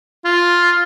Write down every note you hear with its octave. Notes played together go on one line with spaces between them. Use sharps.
F4